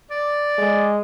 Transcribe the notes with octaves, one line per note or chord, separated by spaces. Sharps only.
D5
G#3